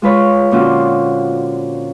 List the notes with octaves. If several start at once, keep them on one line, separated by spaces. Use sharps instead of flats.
G#3 F4 B4 C#5
A#2 D3 C4 C#4 F4 F#4